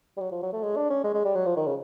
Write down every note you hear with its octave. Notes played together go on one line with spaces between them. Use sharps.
G3
F#3
F3
F#3
A3
G#3
D4
C#4
G#3
G#3
G3
F#3
F3
D#3
C#3